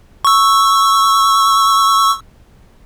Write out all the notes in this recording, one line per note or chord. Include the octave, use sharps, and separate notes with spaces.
C#6 E6